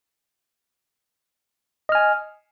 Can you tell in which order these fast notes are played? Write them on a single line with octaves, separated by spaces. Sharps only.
D#5 F6 G#5